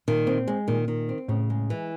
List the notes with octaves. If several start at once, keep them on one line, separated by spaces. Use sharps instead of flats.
A#2 D#3
C4
G#3
A#2 D#3
D#3
C4
A2 C#3
G#3
E3